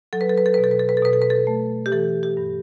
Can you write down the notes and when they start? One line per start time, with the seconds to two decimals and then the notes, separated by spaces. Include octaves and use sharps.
0.13 F#3 A4
0.21 B4
0.30 A4
0.38 B4
0.46 A4
0.54 B4
0.58 B2
0.64 A4
0.71 B4
0.79 A4
0.89 B4
0.97 A4
1.02 B2 B4
1.13 A4
1.22 B4
1.30 A4
1.47 A3
1.86 G4
1.92 E3 A4
2.23 G4
2.37 G2